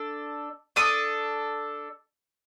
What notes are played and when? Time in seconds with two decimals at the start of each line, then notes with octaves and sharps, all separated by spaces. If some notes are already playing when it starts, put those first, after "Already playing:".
Already playing: D4 A4
0.76 D4 A4 D#6